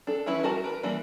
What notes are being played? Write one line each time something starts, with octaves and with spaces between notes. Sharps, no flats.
D4 A4
E3 C#4 E4 B4
G3 F#4 A#4 A5
A#4 B4
E3 G3 A#3 D4